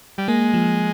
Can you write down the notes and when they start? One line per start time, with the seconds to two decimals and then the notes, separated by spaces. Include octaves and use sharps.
0.18 G3
0.28 G#3 A#3
0.54 F3